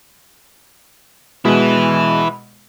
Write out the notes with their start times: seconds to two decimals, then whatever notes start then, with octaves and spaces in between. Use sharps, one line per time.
1.45 B2 G#3 E4 B4